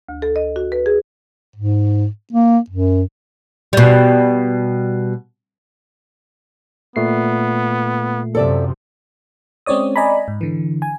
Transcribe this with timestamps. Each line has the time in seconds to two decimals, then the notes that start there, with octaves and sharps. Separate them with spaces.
0.09 D2
0.22 A4
0.36 D#5
0.56 F#4
0.72 B4
0.86 G#4
1.56 G#2
2.33 A#3
2.70 F#2
3.73 B2 G3
6.96 A#2 A3 B3 C7
8.35 F#2 C3 F3 A4 D5 E5
9.66 G#3 C4 C#4 C#5 D5 D#6
9.96 D5 D#5 G#5 A#5 B5
10.28 G#2
10.41 D3 E3
10.82 G#5